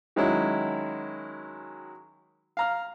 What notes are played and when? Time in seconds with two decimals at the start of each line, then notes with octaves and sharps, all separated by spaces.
0.16 D#3 F#3 G#3 C#4 E4
2.57 F5 A#5 F6